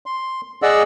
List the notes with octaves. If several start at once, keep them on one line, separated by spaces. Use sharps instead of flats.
C6
G#4 D5 D#5 F#5 E6